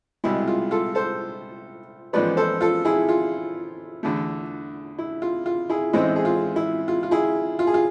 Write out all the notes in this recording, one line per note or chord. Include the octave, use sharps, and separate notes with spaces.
C2 B2 G#3 E4
F4
F4 A4
A4 C5
A1 G#2 F3 B3 B4 D5
A4 C5
F4 A4
E4 G#4
F4
E2 D3 A3
E4
F4
F4
E4 G#4
A1 G#2 G#3 C4 E4
G#4
F4
E4
F4
F4
E4 G#4
F4
G#4
F4